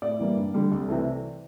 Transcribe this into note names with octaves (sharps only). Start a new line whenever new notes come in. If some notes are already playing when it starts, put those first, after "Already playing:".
A2 D5
E3 G3 A#3
G2
D3 G3
C2
C3 E3 A3